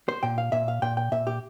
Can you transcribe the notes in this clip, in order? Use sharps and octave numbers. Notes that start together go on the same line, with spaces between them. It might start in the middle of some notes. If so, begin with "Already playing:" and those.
C5
A#2 G5
F5
A#2 E5
F5
A#2 G5
G5
A#2 E5
G4